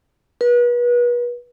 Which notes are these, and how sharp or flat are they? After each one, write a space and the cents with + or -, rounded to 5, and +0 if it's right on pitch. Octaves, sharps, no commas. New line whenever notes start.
B4 -35